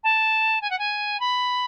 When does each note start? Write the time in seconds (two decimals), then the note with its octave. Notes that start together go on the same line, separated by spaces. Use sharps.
0.04 A5
0.61 G#5
0.70 F#5
0.79 G#5
1.20 B5